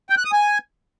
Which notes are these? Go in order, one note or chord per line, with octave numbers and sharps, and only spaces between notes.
G5
F#6
D#6
G#5